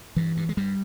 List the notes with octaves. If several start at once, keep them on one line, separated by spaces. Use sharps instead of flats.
G2 E3
G2
G#3
G2 G3